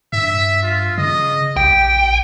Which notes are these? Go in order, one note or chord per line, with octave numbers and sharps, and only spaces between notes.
G2 E5
F4
C#3 D#5
A#1 G4 G5